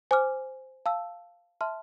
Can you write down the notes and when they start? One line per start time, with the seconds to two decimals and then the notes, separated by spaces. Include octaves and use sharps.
0.11 C5 G#5 D6 F6
0.86 F5 A5 E6
1.61 E5 A5 C6 F6